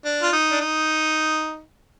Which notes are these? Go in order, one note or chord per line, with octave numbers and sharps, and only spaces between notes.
D4
F4
D#4
D4
D#4